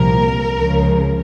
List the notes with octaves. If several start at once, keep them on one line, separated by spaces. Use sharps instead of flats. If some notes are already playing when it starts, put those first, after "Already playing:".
Already playing: C2 A#2 F3 A#4
C#2 C#3 F3